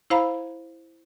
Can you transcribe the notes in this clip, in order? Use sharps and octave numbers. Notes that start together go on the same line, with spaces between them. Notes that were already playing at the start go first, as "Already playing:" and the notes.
E4 C5 F5 A#5 B5